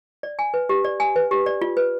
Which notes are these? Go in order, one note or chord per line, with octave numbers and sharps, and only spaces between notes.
D5
G#5
B4
G4
D5
G#5
B4
G4
D5
F4
B4